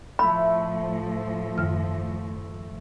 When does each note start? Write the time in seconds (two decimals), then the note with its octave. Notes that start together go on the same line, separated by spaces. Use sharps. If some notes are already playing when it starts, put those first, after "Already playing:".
0.19 A2 F3 A3 E4 E5 B5
1.58 F#2 D#3 F6